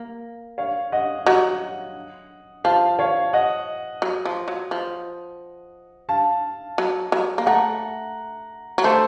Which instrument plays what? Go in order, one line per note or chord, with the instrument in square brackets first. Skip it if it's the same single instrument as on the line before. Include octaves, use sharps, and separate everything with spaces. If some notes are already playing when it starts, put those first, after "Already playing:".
Already playing: [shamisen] A#3
[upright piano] C#5 F5
D#5 F#5
[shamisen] F#3 [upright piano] D#5 F#5
[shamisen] F3 [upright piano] F5 A5
[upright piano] C#5 F5
D#5 F#5
[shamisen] F#3
F3
F#3
F3
[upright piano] F5 A5
[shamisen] F#3
F#3
A#3
[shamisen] A3 [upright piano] F#5 A#5
[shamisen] F#3
[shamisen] A3 [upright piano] A4 C5